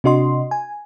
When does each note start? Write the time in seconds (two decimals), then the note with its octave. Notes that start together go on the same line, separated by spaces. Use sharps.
0.04 C3 D4 F#4 D#5 C6
0.51 G#5